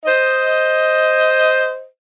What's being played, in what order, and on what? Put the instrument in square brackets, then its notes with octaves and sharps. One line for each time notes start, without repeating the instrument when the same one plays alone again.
[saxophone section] C5 D#5